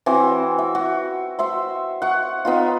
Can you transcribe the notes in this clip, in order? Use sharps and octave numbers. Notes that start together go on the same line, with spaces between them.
E3 C4 F#4
E5
F#4
C5 E5 C6
F#5 C#6
B3 D#4 F4